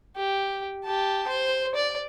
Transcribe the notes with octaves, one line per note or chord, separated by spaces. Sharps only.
G4
G4 A5
C5
D5